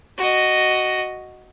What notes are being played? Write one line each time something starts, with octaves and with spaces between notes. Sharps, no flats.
F#4 D#5